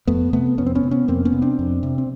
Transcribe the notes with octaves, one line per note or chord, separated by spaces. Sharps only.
F2 A3 B3
C3 A3 B3
F2 B3 C#4
C4
B3 C#4
C3
B3 C#4
F2 A#3 C4
B3 C#4
C3
C4 D4
F2
C3
C4